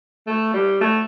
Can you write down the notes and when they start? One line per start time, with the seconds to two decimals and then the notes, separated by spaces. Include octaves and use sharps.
0.27 A3
0.54 G3
0.81 A3